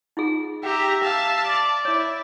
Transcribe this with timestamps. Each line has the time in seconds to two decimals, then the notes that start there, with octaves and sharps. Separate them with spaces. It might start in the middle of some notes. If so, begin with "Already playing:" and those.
0.17 D#4 F4 G#4
0.63 G4 E5 G5 A#5
1.03 F5 A5
1.44 D5
1.85 E4 C#5